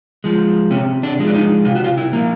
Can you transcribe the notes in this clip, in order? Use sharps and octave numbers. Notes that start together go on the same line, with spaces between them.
F3 G#3
C3 C#4
D4
F3 G#3
D4
D#4
C3 F4
F#4
F4
E4
F3 A#3